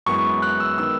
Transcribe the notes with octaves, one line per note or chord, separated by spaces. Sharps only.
F#2 E3 G#3 B3 C#6
F#6
E6
D#3 G#3 B3 E6